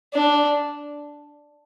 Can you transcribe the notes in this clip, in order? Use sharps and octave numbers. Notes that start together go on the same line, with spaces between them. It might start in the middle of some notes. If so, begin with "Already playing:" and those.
D4